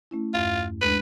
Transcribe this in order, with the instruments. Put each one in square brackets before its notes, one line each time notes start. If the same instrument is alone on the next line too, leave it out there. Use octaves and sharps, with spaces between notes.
[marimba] A3 C#4 E4
[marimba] E2 G2 [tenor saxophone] F4
[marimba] D#2 G#3 D4 [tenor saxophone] B4